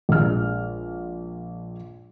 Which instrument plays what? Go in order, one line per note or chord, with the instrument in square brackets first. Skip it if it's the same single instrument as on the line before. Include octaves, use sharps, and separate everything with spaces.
[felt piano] A#1 G#3 F6